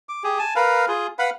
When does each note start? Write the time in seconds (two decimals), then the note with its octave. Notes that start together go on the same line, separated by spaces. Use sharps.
0.09 D6
0.24 G4 G#4
0.39 G#5 A5
0.56 A#4 B4 F5
0.88 F4 G#4
1.19 B4 F5 F#5 B5